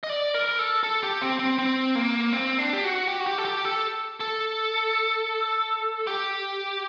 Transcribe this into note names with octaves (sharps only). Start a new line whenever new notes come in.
D#5
D5
A#4
A4
A4
G4
C4
C4
C4
A#3
C4
D4
G4
F#4
G4
F#4
G4
A4
G4
A4
A4
G4